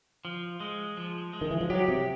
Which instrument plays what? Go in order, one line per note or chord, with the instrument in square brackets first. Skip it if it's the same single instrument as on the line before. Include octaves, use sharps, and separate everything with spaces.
[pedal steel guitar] F3
G#3
F3
G#3
[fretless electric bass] D#3
E3
F3
[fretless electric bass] F#3 [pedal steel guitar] G4
[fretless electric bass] C3